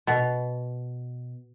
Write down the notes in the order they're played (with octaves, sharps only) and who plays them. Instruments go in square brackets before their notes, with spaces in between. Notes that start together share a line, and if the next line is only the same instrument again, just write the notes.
[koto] B2